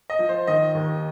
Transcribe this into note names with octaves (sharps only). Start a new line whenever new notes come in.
D#5
F3
C5
D#3 D#5
D#2